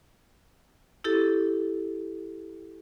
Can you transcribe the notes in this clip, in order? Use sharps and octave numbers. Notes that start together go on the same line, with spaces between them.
E4 G4 A4 A6